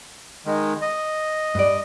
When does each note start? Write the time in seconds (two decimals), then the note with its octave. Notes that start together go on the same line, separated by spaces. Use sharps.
0.46 D#3 G#3
0.82 D#5
1.55 G2 D5